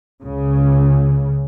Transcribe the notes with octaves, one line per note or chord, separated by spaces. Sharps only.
C#2 C#3